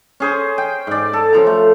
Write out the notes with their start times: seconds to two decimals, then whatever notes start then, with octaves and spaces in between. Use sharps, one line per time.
0.20 C#4 G#4 C5
0.58 G5
0.87 G#2 D5
1.13 A4
1.33 C#3 F3 A#5
1.47 A3